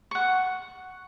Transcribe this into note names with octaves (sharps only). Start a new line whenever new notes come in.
F#5 C#6